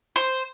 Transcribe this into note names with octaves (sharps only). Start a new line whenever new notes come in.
C5